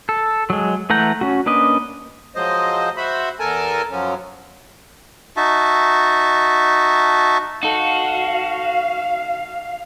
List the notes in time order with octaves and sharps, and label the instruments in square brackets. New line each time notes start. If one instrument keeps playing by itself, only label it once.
[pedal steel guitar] A4
F#3 G#3
E3 A3 F#5 A#5 G6
C#4 F#4
A#3 C#4 D4 B4 D#5
[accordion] F3 F#3 G#3 C5 D#5
F#4 C5 E5 B5
E2 A4 A#4 G#5 A5
F#2 F3 F#3 C#4
[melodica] D#4 F#4 E5 A5
[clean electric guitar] D#4 A4 [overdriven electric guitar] F#4 [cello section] F5